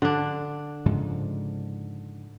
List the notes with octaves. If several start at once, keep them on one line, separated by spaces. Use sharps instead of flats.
D3 D4
G#2 C#3 F3